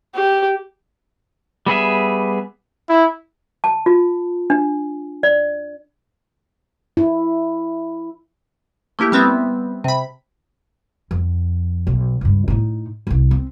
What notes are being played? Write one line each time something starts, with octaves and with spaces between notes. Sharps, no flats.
G4
G3 B3 G#4 E5
E4
A5
F4
D4
D5
E4
A3 A#3 E4 G4
G3 B3 C4 E5
C3 B5
F2
B1
C#2 G2
A2 D#4
E1 C2
C4